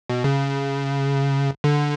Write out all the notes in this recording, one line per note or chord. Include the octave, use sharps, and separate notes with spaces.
B2
C#3
D3